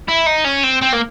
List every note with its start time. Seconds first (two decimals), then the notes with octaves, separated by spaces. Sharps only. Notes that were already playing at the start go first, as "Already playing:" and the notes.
0.08 E4
0.26 D#4
0.44 C#4
0.64 C4
0.82 C4
0.94 A#3